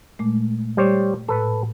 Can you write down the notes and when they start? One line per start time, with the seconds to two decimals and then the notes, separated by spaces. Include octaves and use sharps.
0.19 A#2 G#3 A3
0.77 G3 C5 C#5
1.29 A2 A4 B4